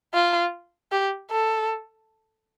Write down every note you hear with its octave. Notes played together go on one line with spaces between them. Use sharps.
F4
G4
A4